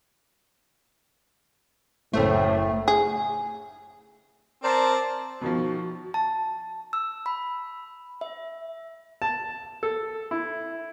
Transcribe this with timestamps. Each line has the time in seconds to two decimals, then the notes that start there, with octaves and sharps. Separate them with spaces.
2.13 F#1 A2 A3 A4 C5
2.88 G#4
4.63 C4 A#4 C5 D5 A5
5.41 B2 D#3 F3 F#4
6.14 A5
6.93 E6
7.26 B5
8.21 E5
9.22 A5
9.83 A4
10.31 E4